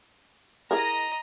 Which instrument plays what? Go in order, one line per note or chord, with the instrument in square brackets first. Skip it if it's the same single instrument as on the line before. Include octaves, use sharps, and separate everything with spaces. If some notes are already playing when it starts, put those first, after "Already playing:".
[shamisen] E4 G#4 A#4 [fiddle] D#5 A#5